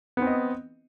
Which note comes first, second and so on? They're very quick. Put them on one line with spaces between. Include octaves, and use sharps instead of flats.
B3 C4 D#5